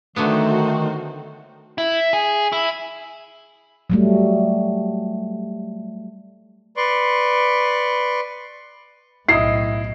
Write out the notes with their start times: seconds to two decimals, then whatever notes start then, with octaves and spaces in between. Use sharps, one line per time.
0.16 D3 D#3 F#3 A3 B3 D#4 F#4 C5
1.78 E4
2.13 G#4
2.52 E4
3.90 F#3 G3 A3
6.77 B4 D5 C6 C#6
9.28 B1 A2 E4 D#5 D#6 C7